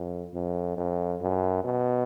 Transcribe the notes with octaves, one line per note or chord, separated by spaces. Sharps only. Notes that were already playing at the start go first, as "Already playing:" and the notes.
Already playing: F2
F2
F2
F#2
B2